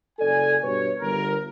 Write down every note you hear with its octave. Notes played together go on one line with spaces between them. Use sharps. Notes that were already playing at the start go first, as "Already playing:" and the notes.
F#1 A4 D5 G#5
G2 B2 B4 C#5
G1 A#4